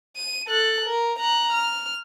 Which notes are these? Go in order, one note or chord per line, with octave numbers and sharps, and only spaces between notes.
D#7
A4 F#6
A#4
A#5 F#6
F6